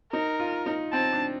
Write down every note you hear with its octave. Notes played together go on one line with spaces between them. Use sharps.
D#4 A#4
F4
D#4
C4 A5
D4